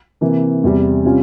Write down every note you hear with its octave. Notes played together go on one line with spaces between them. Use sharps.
C3 E3 A#3
E2 C3 G3
C3 G3 C#4 F4